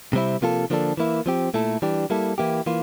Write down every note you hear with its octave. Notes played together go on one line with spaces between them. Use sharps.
C3 G3 C4 E4
C3 F3 A#3 F4 A4
D3 F3 A#3 D4 A4
E3 A#3 E4
F3 C4 G4
A#2 A3 E4 A4
E3 G3 D4 G4
G3 A#3 E4 A4
E3 A#3 E4 G4
E3 A#3 F4